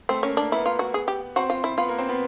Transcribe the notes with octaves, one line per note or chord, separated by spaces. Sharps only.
A3 C4 A4
A#3 C#4 A#4
A#3 D4 A#4
B3 E4 B4
F4
F#4
G#4
G4
C4 F#4 C5
F4
E4
B3 F4 B4
A#3 A#4
C4 C5
B3 B4